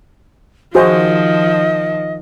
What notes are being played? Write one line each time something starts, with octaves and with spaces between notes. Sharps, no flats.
D#3 F3 F#4 G#4 C5 D#5